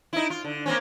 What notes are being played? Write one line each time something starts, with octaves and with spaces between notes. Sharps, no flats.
D#4 E4
F4
D3
A#3 C4 C#4